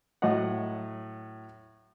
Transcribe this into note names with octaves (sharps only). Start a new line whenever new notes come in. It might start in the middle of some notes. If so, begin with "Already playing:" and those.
A2 F#3 D#5 F#5